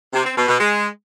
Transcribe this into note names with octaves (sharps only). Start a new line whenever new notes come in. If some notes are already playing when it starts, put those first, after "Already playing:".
C3
C4
B2
B2
G#3